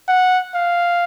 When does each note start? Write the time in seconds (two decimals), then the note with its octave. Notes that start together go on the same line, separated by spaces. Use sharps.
0.08 F#5
0.55 F5